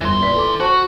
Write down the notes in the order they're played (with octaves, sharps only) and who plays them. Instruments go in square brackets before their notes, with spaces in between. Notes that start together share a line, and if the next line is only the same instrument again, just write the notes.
[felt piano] G1 [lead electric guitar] E3 C6
[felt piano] A#2 B4 B6
A4 D6
[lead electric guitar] F#4 [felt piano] C5 A5 C#6